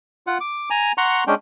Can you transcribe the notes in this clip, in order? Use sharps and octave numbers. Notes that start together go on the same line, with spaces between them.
F4 F#5
D6
G#5 A#5
F#5 A#5 C6 C#6
G#3 C#4 D4 G5